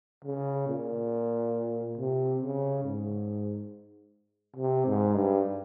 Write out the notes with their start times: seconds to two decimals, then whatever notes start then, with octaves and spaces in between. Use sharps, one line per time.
0.24 C#3
0.68 A#2
1.97 C3
2.42 C#3
2.84 G#2
4.56 C3
4.86 G#2
5.15 G2